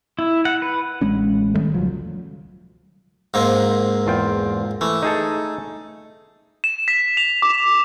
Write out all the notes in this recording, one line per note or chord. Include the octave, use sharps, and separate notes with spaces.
E4
F#5
B4
A1 G#3 C#4
D#3 G3 A3
E1 C#2 F3 F#3
G#2 A#3 C4
E2 F4 G5
E3 A3
D#4 G#4 A4
E7
B6
F7
D6